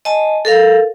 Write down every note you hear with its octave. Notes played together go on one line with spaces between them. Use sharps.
D#5 G#5 A5
A4 A#4 F5